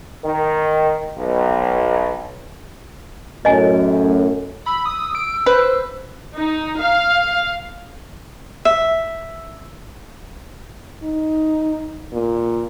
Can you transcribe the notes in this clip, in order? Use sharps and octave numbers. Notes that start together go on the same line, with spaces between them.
D#3
B1
F#2 A2 D#5 G#5
B5 E6
D#6
D7
B4 C5
D#4
F5
E5
D#4
A#2